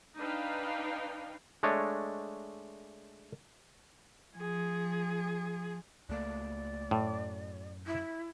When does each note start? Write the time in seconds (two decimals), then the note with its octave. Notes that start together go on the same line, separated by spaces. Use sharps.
0.17 D4 D#4 B4 F5 G5
1.63 G#3 A3 D4 C#5 D#5
4.36 F3 G#4
6.09 C#2 A3 A#3 D5
6.91 F#2 A2
7.85 E4